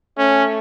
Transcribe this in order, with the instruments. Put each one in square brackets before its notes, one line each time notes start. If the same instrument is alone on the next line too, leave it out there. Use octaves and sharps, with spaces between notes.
[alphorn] A3 [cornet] C#4